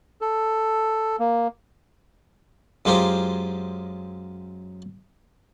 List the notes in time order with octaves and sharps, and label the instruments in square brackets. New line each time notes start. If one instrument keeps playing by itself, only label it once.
[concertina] A4
A#3
[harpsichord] F#2 G#3 F4 G4 A#4 C5